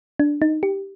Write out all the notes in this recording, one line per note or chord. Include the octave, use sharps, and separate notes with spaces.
D4
D#4
G4